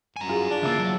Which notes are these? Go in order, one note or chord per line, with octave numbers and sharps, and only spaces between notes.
F#2 G#5 A#5
F4 G#4
D4
C#3 A#3 E5 D6 A6
F#3